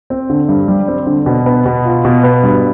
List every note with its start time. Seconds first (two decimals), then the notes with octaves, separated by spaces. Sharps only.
0.10 C4
0.30 D3
0.49 G2
0.68 G3
0.88 C4
1.07 D3
1.26 B2
1.46 B3
1.66 B2
1.85 F4
2.05 B2
2.24 B3
2.43 G2